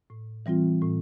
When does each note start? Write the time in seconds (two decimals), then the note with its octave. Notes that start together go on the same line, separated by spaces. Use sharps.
0.10 A2
0.46 E3 G3 C4 F4
0.81 A2